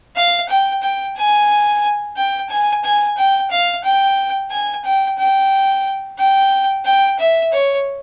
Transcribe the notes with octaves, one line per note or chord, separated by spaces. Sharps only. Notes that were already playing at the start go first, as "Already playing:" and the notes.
F5
G5
G5
G#5
G5
G#5
G#5
G5
F5
G5
G#5
G5
G5
G5
G5
E5
C#5